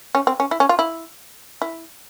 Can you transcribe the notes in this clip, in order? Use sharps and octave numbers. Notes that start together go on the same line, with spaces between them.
C#4
C4
C#4
E4
C#4
F4
E4
E4